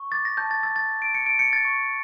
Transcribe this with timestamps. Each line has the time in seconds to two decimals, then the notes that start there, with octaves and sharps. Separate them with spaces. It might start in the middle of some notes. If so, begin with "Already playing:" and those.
Already playing: C#6
0.12 D6 A6
0.25 A#6
0.37 A5 G6
0.51 A6
0.63 E6 A6
0.76 A6
0.89 A5
1.02 D7
1.15 G6 C#7
1.26 D7
1.39 G6 C#7
1.53 A6
1.65 C#6